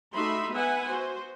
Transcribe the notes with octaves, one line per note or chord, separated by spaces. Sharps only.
A3 D#4 F#4 E5 B5 C6
B3 B4 E5 F#5 G#5
F#4 C5